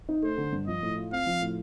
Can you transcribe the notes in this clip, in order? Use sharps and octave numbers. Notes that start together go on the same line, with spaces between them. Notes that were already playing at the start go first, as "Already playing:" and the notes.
D#4
A3 C5
D3
G2
F3 D#5
A2
F4
C4 F5
F3
A2